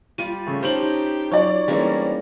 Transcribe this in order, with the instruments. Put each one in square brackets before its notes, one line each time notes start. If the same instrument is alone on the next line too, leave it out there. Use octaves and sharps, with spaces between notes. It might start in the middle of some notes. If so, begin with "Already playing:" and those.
[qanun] G3 F4 D5 [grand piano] D#7
[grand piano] C#3 A3
[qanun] C#4 D#4 [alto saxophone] G4 [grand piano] C5 A5 F#7
[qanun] D#4
[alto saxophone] F#3 [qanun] F4 [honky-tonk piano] C#5 D5
[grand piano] E3 G3 [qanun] G#3 A#3 C#4 [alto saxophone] C4